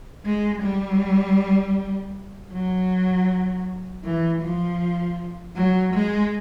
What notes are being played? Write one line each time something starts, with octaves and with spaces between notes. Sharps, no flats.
G#3
G3
F#3
E3
F3
F#3
G#3